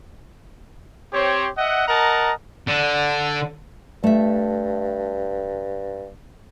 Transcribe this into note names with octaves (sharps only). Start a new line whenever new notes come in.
C4 G4 C5 C#5
D#5 E5 F#5
A#4 D#5 F#5 A5 A#5
D3
G2 A3 E5